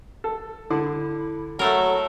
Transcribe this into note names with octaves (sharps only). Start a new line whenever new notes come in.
A4
D3 E4
F#3 A3 A4 A#4 B5